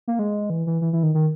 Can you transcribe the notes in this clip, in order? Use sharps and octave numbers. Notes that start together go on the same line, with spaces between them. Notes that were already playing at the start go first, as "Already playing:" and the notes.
A#3
G#3
E3
E3
E3
E3
D#3
D#3